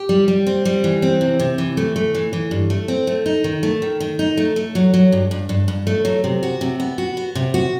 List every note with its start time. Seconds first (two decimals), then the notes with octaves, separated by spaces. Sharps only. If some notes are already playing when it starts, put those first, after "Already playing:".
Already playing: G4
0.09 G3
0.28 G3
0.47 C4
0.65 G3
0.84 E3
1.02 C4
1.21 C3
1.40 C3
1.58 E3
1.77 A3
1.96 A3
2.15 E3
2.33 E3
2.51 G2
2.70 A3
2.88 C4
3.07 A3
3.26 D#4
3.44 D#3
3.63 A3
3.82 D#3
4.00 D#3
4.19 D#4
4.37 A3
4.56 A3
4.75 F#3
4.94 F#3
5.12 G2
5.31 G2
5.49 G2
5.68 G2
5.87 A3
6.05 F#3
6.24 C3
6.43 F#4
6.61 C3
6.80 B3
6.98 F#4
7.17 B3
7.35 C3
7.54 F#4